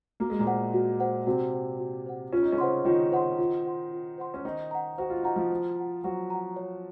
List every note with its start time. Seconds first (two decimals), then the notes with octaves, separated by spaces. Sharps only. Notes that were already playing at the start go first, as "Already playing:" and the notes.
0.20 A#3 F#4
0.30 G#3
0.39 A#2 A#3
0.46 C5 F#5
0.74 F#4
1.00 C5 F#5
1.26 C3 C4 F#4
1.53 C5 F#5
1.79 F#4
2.06 C5 F#5
2.33 C#4 F4
2.43 D#4
2.52 C#3 C#4
2.58 C5 F#5 C6
2.85 D#3 D#4 F4
3.12 C5 F#5 C6
3.38 F4
3.65 C5 F#5 C6
3.91 F4
4.18 C5 F#5 C6
4.34 C#4
4.45 D#3 D#4 C5
4.71 F#5 A#5
4.98 F#4 C5
5.10 F4
5.23 D#4 F#5 A#5
5.36 F3 F4
5.51 C5
5.77 F#5 A#5
6.04 F#3 F#4 C5
6.30 F#5 A#5
6.56 C#5